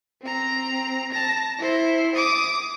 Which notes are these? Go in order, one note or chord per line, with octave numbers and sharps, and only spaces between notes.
C4 A#5
A5 A#6
E4 C5
D6 D#6